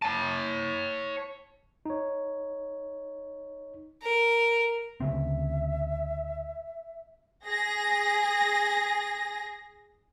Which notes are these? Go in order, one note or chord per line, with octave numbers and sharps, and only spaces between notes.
C#5 A5
D#4 C#5
A#4
D2 C#3 C4 E5
G#4 A#6